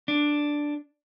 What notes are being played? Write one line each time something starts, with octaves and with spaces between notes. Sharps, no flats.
D4